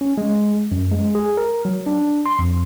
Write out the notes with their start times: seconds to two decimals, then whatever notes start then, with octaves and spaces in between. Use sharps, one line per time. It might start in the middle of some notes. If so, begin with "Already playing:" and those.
0.01 C#4
0.18 G#3
0.72 F#2
0.92 G#3
1.15 G#4
1.37 A#4
1.65 F#3
1.86 D4
2.26 C6
2.39 F2